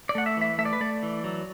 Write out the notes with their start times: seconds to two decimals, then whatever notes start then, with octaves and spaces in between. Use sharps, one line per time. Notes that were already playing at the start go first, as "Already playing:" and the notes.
0.09 D5
0.15 A3 F#5
0.26 E5
0.37 E3 E5
0.58 A3 E5
0.65 D5
0.73 B4
0.80 A3 D5
1.03 E3
1.24 F#3